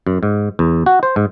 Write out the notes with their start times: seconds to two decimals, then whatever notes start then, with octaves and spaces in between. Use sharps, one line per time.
0.07 F#2
0.23 G#2
0.59 E2
0.86 F#4
1.03 C5
1.16 G#2